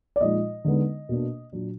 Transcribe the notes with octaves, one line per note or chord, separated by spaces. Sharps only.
D5
A#2 F3 G#3 D#4 D#5
D3 G#3 B3 D#4
B2 A#3 D4
A#2 F#3 D4